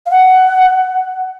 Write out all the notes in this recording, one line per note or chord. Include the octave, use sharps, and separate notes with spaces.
F5
F#5